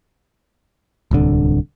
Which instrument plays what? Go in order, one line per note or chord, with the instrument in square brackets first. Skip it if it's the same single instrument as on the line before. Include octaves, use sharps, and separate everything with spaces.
[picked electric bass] D1 C2 D3